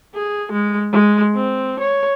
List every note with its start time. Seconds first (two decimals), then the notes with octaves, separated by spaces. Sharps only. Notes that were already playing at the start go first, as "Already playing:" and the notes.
0.14 G#4
0.52 G#3
0.92 G#3
1.35 C4
1.80 C#5